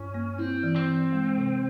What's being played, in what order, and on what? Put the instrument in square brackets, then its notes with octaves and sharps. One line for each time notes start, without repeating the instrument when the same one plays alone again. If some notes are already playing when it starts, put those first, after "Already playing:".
Already playing: [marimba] G2 [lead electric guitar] C#4
[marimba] A#3
[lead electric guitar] C4 [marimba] E4
[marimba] E3
[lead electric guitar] C4
[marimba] E3
G#3
C3